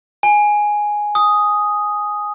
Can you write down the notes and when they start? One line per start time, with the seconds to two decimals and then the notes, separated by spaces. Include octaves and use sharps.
0.23 G#5
1.15 D#6